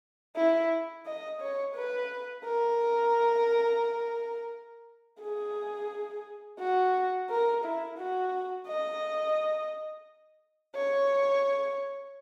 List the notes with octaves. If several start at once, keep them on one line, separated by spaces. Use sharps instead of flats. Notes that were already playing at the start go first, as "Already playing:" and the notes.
E4
D#5
C#5
B4
A#4
G#4
F#4
A#4
E4
F#4
D#5
C#5